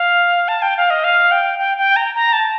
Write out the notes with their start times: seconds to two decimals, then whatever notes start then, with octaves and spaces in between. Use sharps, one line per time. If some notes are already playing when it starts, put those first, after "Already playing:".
Already playing: F5
0.48 A5
0.62 G5
0.77 F5
0.90 D#5
1.04 F5
1.31 G5
1.59 G5
1.78 G5
1.96 A#5
2.15 A#5
2.33 A5